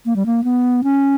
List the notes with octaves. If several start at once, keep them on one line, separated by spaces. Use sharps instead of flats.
A#3
G3
A#3
B3
C#4